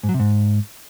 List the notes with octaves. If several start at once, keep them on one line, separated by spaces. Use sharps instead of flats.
G#2
F#3
C3
G#2